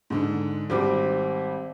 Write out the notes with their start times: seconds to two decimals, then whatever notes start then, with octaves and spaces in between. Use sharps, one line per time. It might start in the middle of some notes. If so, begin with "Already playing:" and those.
0.10 G#2 D3
0.70 G#1 G3 C4 D6